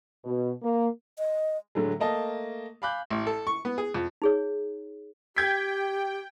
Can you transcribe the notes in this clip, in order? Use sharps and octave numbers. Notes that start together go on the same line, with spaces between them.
B2
A#3
D#5
A2 D3 F#3 G#3
A3 A#3 D#5 A5
F5 G#5 B5 D6 F#6 G6
A1
A4
C#6
B3
G#4
F2
D#4 G#4 C#5
G4 G5 G6 G#6 B6